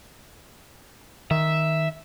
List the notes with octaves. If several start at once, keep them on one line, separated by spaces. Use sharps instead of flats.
D#3 E5